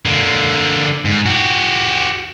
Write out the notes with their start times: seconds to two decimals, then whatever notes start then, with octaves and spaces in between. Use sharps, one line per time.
0.06 D3 A#3
1.05 G#2
1.26 F#4 G4